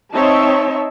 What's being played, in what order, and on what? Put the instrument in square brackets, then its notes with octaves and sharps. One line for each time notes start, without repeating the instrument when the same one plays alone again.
[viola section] C4 D#4 C#5 D#5 E5 A5